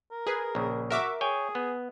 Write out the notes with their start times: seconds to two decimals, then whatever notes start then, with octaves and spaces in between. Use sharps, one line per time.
0.11 A#4
0.27 G#4 B4
0.55 A#1 C#3
0.90 F#4 A#4 E5 D6
1.21 G#4 C#5 G5 G#5
1.55 B3